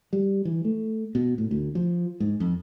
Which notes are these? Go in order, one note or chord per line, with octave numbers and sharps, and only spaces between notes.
G3
E3
A3
B2
A2
D2
F3
G#2
F2